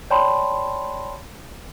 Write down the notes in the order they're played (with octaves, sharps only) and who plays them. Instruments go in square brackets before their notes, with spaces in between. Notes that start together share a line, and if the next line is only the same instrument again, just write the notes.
[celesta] C#5 D5 G5 A5 B5 C6